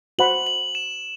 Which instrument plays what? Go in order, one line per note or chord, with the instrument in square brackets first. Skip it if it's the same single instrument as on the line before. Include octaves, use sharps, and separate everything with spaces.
[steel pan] F#4 C5 F#5 B5 [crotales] F#7
[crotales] F#7
E7